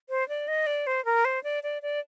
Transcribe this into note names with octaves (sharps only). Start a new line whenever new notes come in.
C5
D5
D#5
D5
C5
A#4
C5
D5
D5
D5